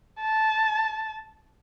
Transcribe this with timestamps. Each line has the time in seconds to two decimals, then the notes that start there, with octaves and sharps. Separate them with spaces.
0.20 A5